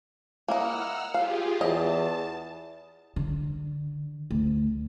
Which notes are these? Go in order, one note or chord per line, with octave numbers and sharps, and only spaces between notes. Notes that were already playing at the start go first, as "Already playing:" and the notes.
A#3 E4 D#5 F#5 E6 F6
F4 G4 G#4 F5
E2 D#5 A5
D3
D2